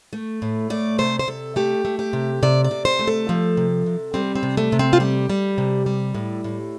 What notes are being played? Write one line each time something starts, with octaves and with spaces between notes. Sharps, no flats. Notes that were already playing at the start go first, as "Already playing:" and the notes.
A3
A2
A3 D5
C3 C5
C5
C3 A4
A3 G4
A3
G4
C3
C3 D5
D5
C3
C5
A3
A4
F3
C3
C3
G3 C4
C4
C3
A3
C3
C4
F4
G3 G4
G3
C3
G3
A2
A2